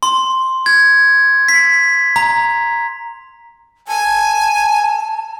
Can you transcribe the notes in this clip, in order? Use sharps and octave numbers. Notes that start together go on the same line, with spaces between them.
C6
G#6
B6
A#5
G#5 A5